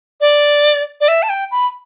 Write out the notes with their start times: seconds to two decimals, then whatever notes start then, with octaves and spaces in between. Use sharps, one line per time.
0.21 D5
1.01 D5
1.08 E5
1.23 A5
1.29 G5
1.51 B5